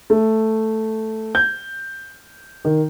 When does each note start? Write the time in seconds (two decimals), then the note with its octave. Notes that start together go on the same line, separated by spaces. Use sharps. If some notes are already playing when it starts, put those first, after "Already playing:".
0.10 A3
1.35 G6
2.65 D#3